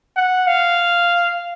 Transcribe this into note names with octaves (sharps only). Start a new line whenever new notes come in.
F#5
F5